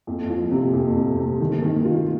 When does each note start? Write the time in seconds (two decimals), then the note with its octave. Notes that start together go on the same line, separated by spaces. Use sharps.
0.07 F2
0.29 F3
0.51 C3
0.73 F2
0.96 F2
1.18 C3
1.40 D#3
1.62 D#3
1.85 F4